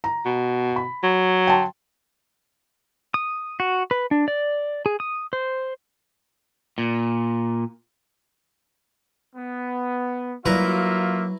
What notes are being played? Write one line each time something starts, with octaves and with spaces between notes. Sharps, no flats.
A#5
B2
B5
F#3
G5 A5 C6
D#6
F#4
B4
D4
D5
G#4
D#6
C5
A#2
B3
F#3 A#3 E4 F4 B4 E5 A#5